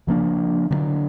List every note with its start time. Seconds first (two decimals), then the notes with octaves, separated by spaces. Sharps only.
0.07 C#3 F3 A#3 D4
0.70 D3 F#3 B3 D4